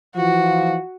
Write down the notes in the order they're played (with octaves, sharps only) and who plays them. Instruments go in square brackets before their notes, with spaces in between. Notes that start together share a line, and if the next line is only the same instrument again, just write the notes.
[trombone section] E3 F3 F4 [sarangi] F#4